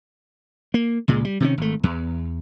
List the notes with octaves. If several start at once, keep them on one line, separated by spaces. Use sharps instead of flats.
A#3
C#2 A#2 G#3
G3
C3 D#3 C#4
G#1 A3
E2